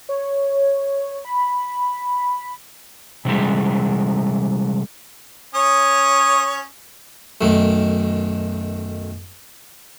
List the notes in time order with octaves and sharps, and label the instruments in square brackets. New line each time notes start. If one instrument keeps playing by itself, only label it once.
[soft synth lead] C#5
B5
[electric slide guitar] C3 E3 G3 G#3
[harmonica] C#4 C#5 D#6
[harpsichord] B1 F#2 D#3 A3